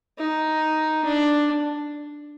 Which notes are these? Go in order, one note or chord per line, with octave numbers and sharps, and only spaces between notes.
D#4
D4